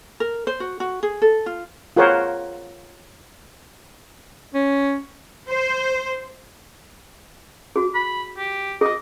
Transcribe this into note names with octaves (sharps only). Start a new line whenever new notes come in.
A#4
C5
F#4
F#4
G#4
A4
F4
F4 G#4 A#4 C5 C#5 F#5
C#4
C5
F#4 G#4
B5
G4
G#4 D#5 D#6